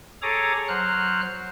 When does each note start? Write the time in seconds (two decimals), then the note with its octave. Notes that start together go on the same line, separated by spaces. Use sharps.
0.22 G#4 A4 C#5 A#5 D6 D#6
0.68 F#3 C5 F6 F#6